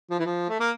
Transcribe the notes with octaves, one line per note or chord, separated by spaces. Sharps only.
F3
E3
F3
A3
A#3